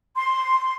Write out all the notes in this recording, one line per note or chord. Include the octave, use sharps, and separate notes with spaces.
C6